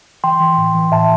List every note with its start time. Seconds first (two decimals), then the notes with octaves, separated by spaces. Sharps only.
0.24 E3 G5 C6
0.40 E3
0.57 A2
0.75 E3
0.91 A2 E5 A5